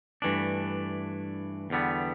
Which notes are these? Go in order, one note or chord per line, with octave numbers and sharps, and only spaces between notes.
G2 E3 A3 D4
E2 D3 G3 B3